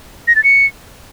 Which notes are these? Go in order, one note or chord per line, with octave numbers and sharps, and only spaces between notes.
A#6
A6
C#7